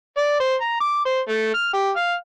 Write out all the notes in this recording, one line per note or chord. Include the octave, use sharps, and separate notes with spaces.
D5
C5
A#5
D6
C5
A3
F6
G4
F5